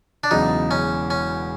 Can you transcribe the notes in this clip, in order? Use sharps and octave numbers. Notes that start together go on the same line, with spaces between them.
D4
E1 E2 C#3 F#3 D#4
C#4
C#4